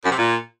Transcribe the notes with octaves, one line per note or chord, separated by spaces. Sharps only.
F#2
C3
A#2